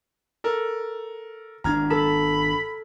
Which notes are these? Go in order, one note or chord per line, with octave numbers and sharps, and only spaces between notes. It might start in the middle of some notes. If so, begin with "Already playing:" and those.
A4 A#4
G#1 D4 A#5 F6 G#6
A4 B5